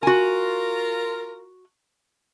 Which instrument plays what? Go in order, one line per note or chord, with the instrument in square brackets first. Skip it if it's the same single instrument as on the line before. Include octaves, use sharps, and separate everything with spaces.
[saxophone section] F4 A#4 [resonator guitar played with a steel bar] F#4 G#5